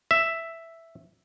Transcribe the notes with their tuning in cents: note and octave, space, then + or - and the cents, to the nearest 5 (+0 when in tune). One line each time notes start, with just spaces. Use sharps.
E5 +5